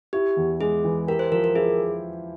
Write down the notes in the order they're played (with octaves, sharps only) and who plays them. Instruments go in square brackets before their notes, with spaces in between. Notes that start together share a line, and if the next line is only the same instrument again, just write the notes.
[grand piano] E4 [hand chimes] G4
[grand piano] E2
[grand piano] G#3 [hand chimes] G#4
[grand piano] E3
[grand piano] G4 [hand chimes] A#4
[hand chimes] C5
[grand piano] F3 [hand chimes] A#4
[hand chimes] A#4
[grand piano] E4 [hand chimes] G#4